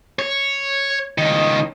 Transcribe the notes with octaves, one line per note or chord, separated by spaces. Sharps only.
C#5
C#2 D#3